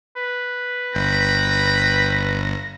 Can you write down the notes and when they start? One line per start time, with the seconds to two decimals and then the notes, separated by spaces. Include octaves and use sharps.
0.16 B4
0.95 G1 G5 B5 A#6